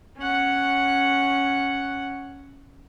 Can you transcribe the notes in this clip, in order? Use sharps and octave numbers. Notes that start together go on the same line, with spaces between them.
C#4 F#5